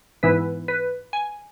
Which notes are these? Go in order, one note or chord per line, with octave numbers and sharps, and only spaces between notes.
G#2 E3 B3 E4 B4
B4
G#5